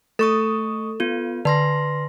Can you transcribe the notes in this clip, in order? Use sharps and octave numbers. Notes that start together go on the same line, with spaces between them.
A3 A4 C#6 D#6
B3 F4
D3 B4 C6 A#6